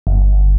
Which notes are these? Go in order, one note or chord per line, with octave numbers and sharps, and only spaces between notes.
G1